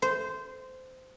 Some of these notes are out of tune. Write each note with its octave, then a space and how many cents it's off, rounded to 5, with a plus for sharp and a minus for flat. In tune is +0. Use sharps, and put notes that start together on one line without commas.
C5 -15